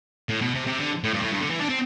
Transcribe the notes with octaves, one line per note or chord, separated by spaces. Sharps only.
A2
B2
C3
C3
D3
A2
G2
A2
G2
D3
E3
D4
C4